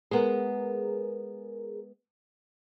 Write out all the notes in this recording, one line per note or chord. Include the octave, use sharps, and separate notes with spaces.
G#3 B3 G#4 A#4